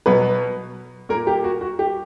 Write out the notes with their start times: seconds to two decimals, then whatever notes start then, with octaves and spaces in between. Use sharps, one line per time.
0.06 B2 F#3 B3 B4
1.09 A#2 A#3 A#4
1.27 G4
1.44 F#4
1.61 F#4
1.79 G4